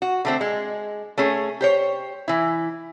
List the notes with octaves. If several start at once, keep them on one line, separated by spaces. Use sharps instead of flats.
F#4
D3 A3 C4
G#3
A3 C#4 G#4
G4 C5 C#5
E3 E4